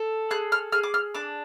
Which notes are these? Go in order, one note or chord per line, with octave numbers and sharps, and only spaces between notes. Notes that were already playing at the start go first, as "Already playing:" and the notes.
Already playing: A4
G#4 F#6
F6
G#4 F6
D6
F6
D4 D6